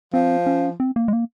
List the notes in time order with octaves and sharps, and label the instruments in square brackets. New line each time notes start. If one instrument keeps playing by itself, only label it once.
[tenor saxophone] F3 [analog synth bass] C4
[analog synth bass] C#4
C4
A#3
G#3
A#3